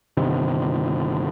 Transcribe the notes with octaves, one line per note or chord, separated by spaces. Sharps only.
G1 C3 D#3